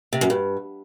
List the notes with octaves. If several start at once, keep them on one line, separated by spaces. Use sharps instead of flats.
C3
F#2
G2